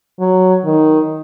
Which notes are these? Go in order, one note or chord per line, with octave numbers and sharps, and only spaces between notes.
F#3
D#3